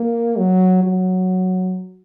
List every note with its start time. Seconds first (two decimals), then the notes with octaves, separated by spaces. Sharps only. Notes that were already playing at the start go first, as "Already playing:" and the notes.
Already playing: A#3
0.38 F#3
0.83 F#3